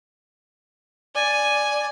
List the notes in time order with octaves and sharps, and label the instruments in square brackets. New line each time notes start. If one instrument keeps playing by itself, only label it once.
[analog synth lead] D5 [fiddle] G#5